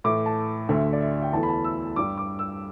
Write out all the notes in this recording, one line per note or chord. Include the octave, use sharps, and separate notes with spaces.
A2 E3 A3 D6
A5
D2 D3 A3 E5
D5
E5
G5
E2 E3 A3 A5
B5
A5
E6
G2 G3 D6
D6
E6